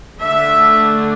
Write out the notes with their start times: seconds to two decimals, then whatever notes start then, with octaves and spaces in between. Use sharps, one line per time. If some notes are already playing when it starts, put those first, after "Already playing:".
0.21 D3 A3 D4 E5